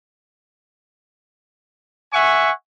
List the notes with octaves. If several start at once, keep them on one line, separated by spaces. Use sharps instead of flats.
E5 F#5 G#5 C#6